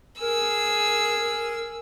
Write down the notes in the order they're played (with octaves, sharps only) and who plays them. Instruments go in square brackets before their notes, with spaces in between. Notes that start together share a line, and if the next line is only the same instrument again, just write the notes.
[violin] G#4 E6 [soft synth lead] A#4